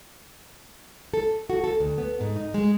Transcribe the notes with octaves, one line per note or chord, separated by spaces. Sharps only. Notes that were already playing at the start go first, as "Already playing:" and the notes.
A4
F#4
A4
D2
B3
G#2
D#4
G#3